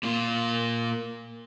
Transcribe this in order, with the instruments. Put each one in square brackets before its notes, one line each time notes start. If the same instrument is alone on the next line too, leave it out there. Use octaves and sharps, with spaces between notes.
[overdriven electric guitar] A#2 F4